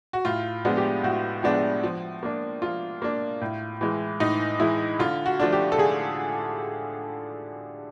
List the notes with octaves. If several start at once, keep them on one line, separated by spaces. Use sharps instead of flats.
F#4
A2 F4
F3 G#3 B3 D4
G4
A2 F#4
F3 G#3 B3 D4
F3
A#3 D4
F3 F4
A#3 D4
A2
E3 G#3
A2 D#4
E3 G#3 E4
D3 F4
F#4
F3 A3 D4
G4
A4
D3 G#4